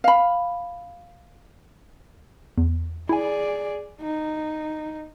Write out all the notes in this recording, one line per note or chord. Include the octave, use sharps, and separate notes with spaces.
F5 B5
E2
E4 G#4 D5 G#5
D#4